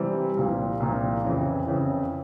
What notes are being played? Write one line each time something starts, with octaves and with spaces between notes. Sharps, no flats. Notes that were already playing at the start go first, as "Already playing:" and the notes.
Already playing: C3 E3 G3 C4
C2 A#2 F3
C2 A#2 F3
F2 C#3 E3
F2 C#3 E3